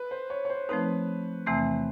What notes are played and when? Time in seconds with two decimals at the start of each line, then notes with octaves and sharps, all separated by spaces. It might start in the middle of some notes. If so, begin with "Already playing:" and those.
Already playing: B4
0.11 C5
0.30 C#5
0.45 C#5
0.50 C5
0.69 F3 A3 C4 D#4 B4
1.47 E2 C3 E3 A3 C4